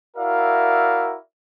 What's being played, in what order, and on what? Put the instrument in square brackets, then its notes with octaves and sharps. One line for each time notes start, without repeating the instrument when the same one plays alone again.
[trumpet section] E4 F#4 A#4 D5 E5 F5